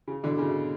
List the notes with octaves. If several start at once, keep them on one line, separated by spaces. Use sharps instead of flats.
C#3
B2 D3
C#3
B2